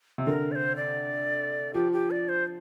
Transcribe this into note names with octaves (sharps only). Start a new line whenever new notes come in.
C3
D3 A#4
D5
C5
D5
F3 G4
G4
D5
C5